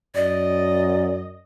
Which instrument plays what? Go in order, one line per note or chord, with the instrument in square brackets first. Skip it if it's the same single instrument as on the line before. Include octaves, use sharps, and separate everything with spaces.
[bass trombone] F#2 [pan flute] D5 [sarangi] D#5